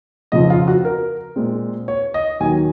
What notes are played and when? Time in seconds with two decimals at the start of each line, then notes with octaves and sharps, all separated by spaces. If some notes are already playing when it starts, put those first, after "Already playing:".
0.32 F2 C#3 F3 C4 D#5
0.50 F4
0.68 F#4
0.85 A#4
1.36 A#2 G#3 C4
1.88 C#5
2.14 D#5
2.40 D#2 D#3 F#3 G#5